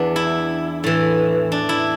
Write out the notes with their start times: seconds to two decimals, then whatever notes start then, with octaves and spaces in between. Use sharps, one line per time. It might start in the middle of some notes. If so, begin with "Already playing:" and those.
Already playing: E2 B3 D4
0.16 E4
0.84 A2 E3
1.52 D4
1.69 E4